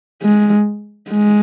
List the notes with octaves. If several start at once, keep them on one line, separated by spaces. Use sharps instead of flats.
G#3
G#3